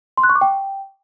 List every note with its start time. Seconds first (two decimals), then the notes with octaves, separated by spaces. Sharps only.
0.17 C6
0.23 F#6
0.29 C#6
0.35 D6
0.41 G5